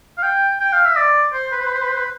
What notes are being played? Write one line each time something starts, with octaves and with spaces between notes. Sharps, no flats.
F5
G5
G5
F5
E5
D5
C5
B4
C5
B4
C5
B4
C5
B4